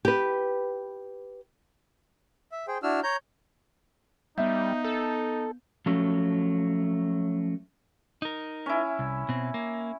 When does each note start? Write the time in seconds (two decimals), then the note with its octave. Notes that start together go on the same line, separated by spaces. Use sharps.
0.05 G4 B4
2.52 E5
2.68 G#4 C5 G5
2.83 D4 E4 F#4 E6 F6
3.03 C#5 A#5 G6
4.38 G3 B3 D#4 E5 G6
4.84 A4
5.86 F3 F#3 A3 C#4
8.22 D#4 A#4
8.66 C#4 E4
8.99 C2
9.29 B2 C4
9.54 A#3